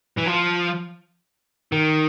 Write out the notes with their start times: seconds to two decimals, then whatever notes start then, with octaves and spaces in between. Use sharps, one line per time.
0.18 E3
0.27 F3
1.72 D#3